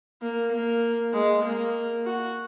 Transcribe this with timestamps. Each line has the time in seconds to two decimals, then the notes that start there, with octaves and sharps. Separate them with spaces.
0.22 A#3
0.52 A#3
1.14 G#3
1.44 A#3
2.06 F#4